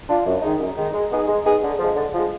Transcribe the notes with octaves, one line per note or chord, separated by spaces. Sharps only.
D4 F4
F#2
D#3 G#3 D#4
F#2
D#3 G#3 D#4
G#3
B3 D#4 G#4
G#3
B3 D#4 G#4
D3
F3 G#3
D3
F3 G#3